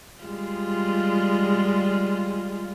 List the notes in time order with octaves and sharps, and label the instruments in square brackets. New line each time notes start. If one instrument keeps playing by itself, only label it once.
[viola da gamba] G3 G#3 F4